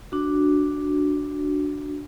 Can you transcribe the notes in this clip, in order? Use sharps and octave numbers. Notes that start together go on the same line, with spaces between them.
D4 F#4